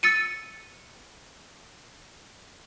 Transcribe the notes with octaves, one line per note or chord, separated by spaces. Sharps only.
E6 A6 C#7 D#7